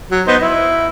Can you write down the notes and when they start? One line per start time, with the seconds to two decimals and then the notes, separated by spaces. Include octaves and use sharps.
0.11 F#3
0.27 B3 D#4 C5
0.42 E4